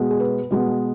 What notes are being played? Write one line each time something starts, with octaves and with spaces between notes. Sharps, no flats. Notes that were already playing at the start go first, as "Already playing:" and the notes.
Already playing: B2 G#3 B3
G#4
B4
B2 G#3 B3